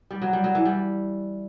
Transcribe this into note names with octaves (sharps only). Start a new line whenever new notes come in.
G3
F#3
G3
F#3
E3
G3